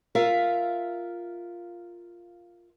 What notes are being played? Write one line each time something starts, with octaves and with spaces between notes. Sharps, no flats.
F4 A#4 E5 F5